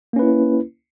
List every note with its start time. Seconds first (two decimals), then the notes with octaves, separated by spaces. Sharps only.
0.13 A#3
0.16 C#4
0.19 B4
0.22 E4